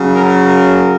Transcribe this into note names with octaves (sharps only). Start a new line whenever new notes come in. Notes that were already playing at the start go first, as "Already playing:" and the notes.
Already playing: C#3 F#3
A#4
A#4